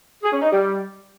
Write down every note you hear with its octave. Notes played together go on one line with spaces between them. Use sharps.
G#4
C#4
D#4
G3